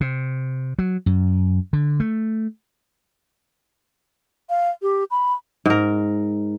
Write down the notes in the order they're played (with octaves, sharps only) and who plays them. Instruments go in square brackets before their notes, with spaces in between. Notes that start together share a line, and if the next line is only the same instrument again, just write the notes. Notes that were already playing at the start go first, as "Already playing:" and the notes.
[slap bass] C3
F#3
F#2
D3
A3
[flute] F5
G4
B5
[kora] G#2 A#4